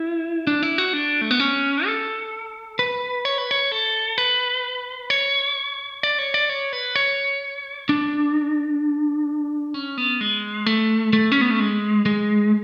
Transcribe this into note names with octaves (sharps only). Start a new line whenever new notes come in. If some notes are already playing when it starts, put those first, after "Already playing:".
Already playing: E4
D4
E4
F#4
D4
A3
B3
C#4
A4
B4
C#5
B4
C#5
A4
B4
C#5
D5
C#5
D5
C#5
B4
C#5
D4
C#4
B3
G#3
A3
A3
C#4
B3
A3
G#3
G#3